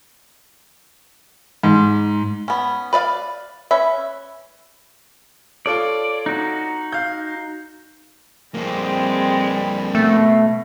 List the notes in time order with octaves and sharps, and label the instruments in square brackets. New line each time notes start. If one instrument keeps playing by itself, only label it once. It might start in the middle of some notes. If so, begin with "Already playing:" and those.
[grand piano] G#2
[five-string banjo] B3 C#4
B4 D5 E5 F5
C#4 B4 E5
[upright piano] F4 A4 C#5 [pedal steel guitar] D5
[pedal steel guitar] D#4 F#4
[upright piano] F5 G6
[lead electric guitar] F2 A#3 [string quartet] G3 G#3 C4
[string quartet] B2 [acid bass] A3